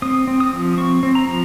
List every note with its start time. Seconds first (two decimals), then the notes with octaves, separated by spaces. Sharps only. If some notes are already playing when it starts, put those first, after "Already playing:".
0.02 C4 D#6
0.27 C4
0.40 D#6
0.53 F3
0.77 C4 C#6
1.03 C4
1.15 A#5
1.28 F3